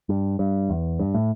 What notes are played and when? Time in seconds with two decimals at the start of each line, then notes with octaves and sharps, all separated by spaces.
0.09 G2
0.39 G2
0.69 E2
0.99 G2
1.14 A2